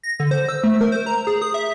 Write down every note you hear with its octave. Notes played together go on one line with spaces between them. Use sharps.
A#6
D3
C5
E6
A3
A#4
C5
A#5
G#4
D#6
E5